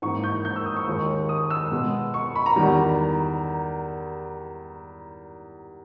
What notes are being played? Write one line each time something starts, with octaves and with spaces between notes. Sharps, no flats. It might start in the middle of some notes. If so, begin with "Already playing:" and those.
G#2 E3 A#3 C#6
G6
G6
E6
D#6
C#6
D#2 D#3 G#3
D#6
E6
B2 G#3 B3
C#6
B5
A#5
E2 D#3 G3